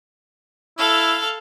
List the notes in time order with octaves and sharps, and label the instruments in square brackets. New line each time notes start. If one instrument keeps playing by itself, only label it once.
[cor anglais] E4 [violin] A4 F5